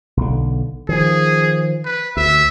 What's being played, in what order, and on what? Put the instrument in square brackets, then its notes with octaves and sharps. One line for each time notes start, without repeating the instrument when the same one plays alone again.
[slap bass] B1 D3
[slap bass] D#3 F3 [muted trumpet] G#4
[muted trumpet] B4
[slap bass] D2 [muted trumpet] E5